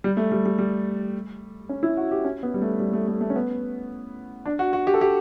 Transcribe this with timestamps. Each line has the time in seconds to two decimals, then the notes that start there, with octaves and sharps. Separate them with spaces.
0.04 G3
0.17 A3
0.32 G3
0.46 G3
0.59 G3
1.69 C#4
1.83 E4
1.97 F#4
2.11 G4
2.24 C#4
2.43 B3
2.54 G3
2.62 A3
2.80 G3
2.93 A3
3.08 A3
3.21 A3
3.30 C#4
3.36 B3
4.46 D4
4.59 F#4
4.73 F#4
4.87 G4
4.94 A4
5.01 G4